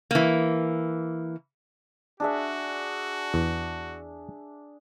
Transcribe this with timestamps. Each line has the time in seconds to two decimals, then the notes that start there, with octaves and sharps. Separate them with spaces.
0.11 E3 A#3
2.20 D4 F#4 G#4 E5
3.34 E2